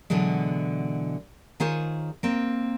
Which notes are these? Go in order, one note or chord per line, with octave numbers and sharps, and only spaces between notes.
B2 D3 E3 F#3 G#3
D#3 F4 G#4 C5 C#5
A#3 C4